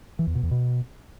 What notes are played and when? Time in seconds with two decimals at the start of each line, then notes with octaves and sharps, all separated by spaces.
0.19 E3
0.27 E2
0.35 B2
0.43 E2
0.51 B2